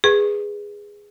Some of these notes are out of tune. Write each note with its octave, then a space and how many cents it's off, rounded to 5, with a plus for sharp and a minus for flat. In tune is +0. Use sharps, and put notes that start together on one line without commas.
G#4 -10 B4 +0 C#6 -30